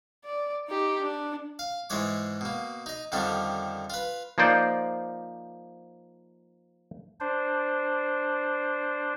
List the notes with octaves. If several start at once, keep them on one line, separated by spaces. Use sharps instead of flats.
D5
D#4 G4
D4
F5
G#2 E3 G#3 C#5 D6
B2 A#3
D#4 D#5
F2 D3 D#3 G3 C#4 D4
F4 B4
F3 A#3 D#4 C5 D5
D4 C5